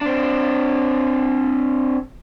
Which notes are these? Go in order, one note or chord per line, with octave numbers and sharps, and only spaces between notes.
C4 D4